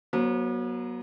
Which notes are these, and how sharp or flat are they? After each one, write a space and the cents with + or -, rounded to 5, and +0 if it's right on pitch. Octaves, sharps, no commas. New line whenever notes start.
F#3 +5 B3 -40 C5 +25